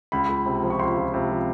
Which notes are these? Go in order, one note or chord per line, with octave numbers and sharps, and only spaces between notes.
C#2 B5
C#2
C3
F3
C#6
C#2 C6
C#2
C3
F3